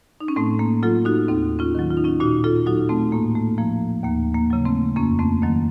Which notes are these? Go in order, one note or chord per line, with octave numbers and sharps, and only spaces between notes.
D#4
C#4
A2 A3 C4
A#3
F#3 F4 A4
D#4 F#4
D#2 C4 D#4
C#4 F4
D#3 F#3
F4
D#4
C#4 F4
A#2 D#4 F#4
F4 A4
F#3 D#4 F#4
A3 C4
A2 A#3
A3
F3 A#3
D#2 A#3
A#3
C#3 F#3
A3 C4
F2 A#3 C#4
A3 C4
D#3 F#3 A#3